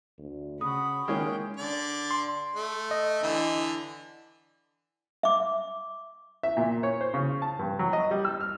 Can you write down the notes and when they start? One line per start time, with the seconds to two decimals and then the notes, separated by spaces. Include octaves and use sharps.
0.19 D2
0.61 C#3 F#4 B5 D#6
1.08 D#3 G#3 A#3 C#4 G5
1.57 D3 D5
2.11 C6
2.55 A3
2.91 D#5
3.23 D3 E3
5.23 E5 D6
6.43 E5
6.57 A#2
6.83 C#5
7.01 C5
7.14 C#3
7.42 A5
7.59 G2
7.79 F#3
7.93 D#5
8.11 G3
8.25 E6
8.40 F6